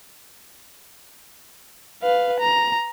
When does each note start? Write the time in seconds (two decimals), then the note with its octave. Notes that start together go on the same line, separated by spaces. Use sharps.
2.03 B4 F5
2.40 A#5